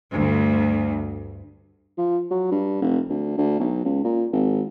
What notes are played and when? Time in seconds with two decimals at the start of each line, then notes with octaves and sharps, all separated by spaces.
0.13 D2 G2
1.98 F3
2.31 F#3
2.51 G2
2.82 F1
3.10 D2
3.38 D2
3.59 B1
3.85 C#2
4.04 A#2
4.33 G#1